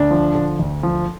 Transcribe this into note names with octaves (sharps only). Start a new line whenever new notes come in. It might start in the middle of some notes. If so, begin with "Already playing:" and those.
Already playing: D2 D4
F3
D3
D2
F3